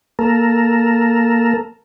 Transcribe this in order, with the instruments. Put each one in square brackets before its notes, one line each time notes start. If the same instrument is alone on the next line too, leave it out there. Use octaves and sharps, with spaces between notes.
[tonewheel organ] A#3 A4 A#4